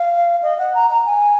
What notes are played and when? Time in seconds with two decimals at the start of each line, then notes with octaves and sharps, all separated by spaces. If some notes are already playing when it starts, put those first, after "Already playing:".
Already playing: F5
0.43 D#5
0.59 F#5
0.75 A#5
0.91 A#5
1.06 G#5